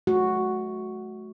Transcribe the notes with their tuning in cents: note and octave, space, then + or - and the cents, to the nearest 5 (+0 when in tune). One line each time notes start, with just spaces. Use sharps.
A3 -35 F#4 +0